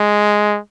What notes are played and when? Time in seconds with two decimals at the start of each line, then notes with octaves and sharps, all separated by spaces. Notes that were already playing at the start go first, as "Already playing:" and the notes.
Already playing: G#3